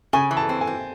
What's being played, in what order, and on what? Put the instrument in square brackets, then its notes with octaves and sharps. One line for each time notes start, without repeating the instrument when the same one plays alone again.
[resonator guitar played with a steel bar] C#3 [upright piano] G#5
[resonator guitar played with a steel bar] E3
[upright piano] A5
[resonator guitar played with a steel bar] C4
[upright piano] G#5
[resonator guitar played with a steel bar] C4